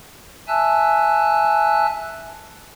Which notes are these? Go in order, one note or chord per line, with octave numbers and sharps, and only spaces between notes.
E5 G#5 A5 E6 F#6